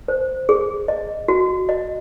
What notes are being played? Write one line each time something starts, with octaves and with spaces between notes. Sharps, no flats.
C5
G#4
D#5
F#4
D#5